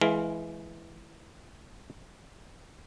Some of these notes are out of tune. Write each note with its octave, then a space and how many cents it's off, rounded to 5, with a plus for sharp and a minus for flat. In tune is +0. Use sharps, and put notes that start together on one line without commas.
E3 +0 G#3 +25 F5 +0